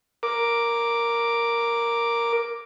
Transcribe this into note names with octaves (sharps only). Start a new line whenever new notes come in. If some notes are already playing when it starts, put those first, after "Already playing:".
A#4 D6